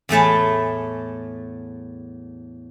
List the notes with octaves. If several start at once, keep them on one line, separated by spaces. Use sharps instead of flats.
E2 A2 A3 A5